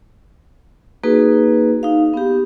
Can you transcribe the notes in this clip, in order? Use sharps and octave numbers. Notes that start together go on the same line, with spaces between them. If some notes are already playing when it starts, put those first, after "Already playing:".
A#3 D#4 F#4 G#4 B4
D#4 F5
B3 G4